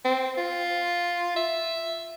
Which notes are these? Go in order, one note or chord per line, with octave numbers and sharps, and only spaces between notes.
C4
F4
E5